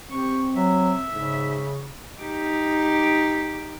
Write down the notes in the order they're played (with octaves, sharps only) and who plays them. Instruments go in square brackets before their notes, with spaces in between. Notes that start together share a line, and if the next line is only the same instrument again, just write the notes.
[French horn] C4 [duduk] G4 [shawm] C#6
[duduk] F#3 [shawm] E5
[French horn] G#2 [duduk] C#3
[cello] D#4 G4